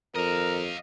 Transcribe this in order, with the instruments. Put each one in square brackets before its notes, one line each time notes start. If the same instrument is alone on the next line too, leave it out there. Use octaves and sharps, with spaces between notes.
[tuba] F2 [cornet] A#4 [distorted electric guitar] D#5 F5